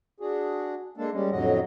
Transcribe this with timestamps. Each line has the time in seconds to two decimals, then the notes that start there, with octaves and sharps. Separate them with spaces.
0.20 D4 F#4 G#4
0.97 G#3 A#3 D4 A4
1.13 G3 G#3 C#4
1.32 F2 A2 D3 F#3 F#4 D#5